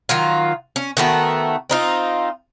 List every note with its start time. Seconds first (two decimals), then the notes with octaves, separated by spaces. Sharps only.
0.09 D#3 F#3 F4
0.76 C#4
0.97 D#3 A3 B3 F#4
1.70 C4 D#4 F4